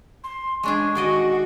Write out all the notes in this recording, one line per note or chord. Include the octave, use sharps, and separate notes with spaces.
C6
G#3 D4 G#4 C#6
D#3 F#4 D5 D#5